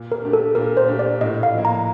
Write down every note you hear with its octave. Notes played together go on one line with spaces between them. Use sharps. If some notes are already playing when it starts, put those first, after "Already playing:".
Already playing: A#2
A#4
A3 D4 G4
A4
A#2 A#4
C5
A3 D4 G4
D5
A2 D#5
F5
F3 A#3
A#5